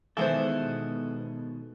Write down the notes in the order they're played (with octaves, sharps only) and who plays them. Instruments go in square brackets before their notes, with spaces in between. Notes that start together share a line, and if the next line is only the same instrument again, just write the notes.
[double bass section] B2 [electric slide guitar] D#3 G#3 A4 [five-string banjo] E3 B3 C5